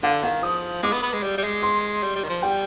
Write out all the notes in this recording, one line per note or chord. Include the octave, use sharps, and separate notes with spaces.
D3 F5
D#3 F5
F3 D#6
G#3 D6
B3
B3
G#3
G3
G3
G#3
C6
G3
G3
D#3
F3
G3 G5